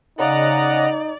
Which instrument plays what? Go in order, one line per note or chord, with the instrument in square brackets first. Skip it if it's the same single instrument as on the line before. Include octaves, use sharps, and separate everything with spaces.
[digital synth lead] C#3 [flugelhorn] D#4 [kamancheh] D5 [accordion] D#5 F#5 A#5